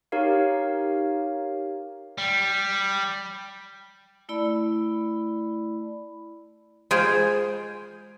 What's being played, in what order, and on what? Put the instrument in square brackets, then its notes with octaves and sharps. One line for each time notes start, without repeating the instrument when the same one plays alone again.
[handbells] D#4 G4 A#4 C#5 F5
[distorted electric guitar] G3
[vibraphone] A3 E4 D5 B5
[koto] G#3 F4 G#4 C5 G5